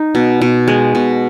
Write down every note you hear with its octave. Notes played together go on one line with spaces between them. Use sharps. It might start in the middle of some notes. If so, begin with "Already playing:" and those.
Already playing: D#4
B2
B2
G#3
B2